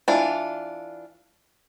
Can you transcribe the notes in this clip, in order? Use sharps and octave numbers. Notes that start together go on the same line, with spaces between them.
E3 D4 F4